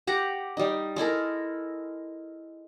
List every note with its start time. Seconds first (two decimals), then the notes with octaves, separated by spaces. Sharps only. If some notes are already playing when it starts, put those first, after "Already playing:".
0.07 G4 F#5 A#5
0.57 G3 D#4
0.96 G#3 E4 A4 A#4